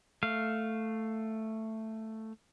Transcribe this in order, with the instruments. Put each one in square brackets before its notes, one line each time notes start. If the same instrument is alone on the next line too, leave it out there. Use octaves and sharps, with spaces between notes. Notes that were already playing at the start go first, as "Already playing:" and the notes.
[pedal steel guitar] A3 F5